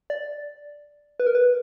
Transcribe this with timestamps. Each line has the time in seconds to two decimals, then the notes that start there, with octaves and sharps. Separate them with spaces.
0.10 D5
1.20 B4
1.27 A#4
1.35 B4